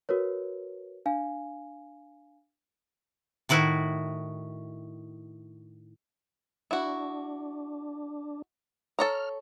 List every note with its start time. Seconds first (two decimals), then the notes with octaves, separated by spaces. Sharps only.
0.09 F#4 A#4 B4 C#5
1.06 D4 F5 G#5
3.49 A2 D#3 E4 F#4
6.71 D4 E4 F#4
8.99 A4 C#5 A#5 F6